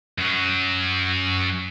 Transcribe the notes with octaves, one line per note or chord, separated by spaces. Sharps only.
F#2 F#3